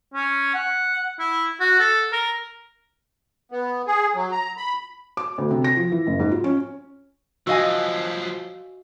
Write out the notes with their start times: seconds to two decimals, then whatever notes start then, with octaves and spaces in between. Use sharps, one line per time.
0.14 C#4
0.54 F#5
1.19 E4
1.60 F#4
1.79 A4
2.13 A#4
3.52 B3
3.87 G#4
4.15 F#3
4.32 A#5
4.57 B5
5.17 D6
5.38 D2
5.51 C3
5.64 A#6
5.77 F3
5.92 E3
6.07 F#1
6.20 G#2
6.32 F4
6.44 C#4
7.47 F3 F#3 F#4 D#5 F5 G#5 E6